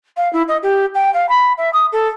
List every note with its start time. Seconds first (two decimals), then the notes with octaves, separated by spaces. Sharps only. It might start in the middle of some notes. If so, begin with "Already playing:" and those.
0.17 F5
0.33 E4
0.48 D#5
0.63 G4
0.94 G5
1.14 F5
1.29 B5
1.57 E5
1.73 D#6
1.92 A4